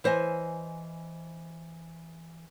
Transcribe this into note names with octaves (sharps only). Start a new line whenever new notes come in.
E3 C5 D#5 G#5